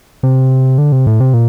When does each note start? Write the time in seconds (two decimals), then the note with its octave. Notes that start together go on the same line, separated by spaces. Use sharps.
0.23 C3
0.78 D3
0.92 C3
1.07 A2
1.20 C3
1.33 A#2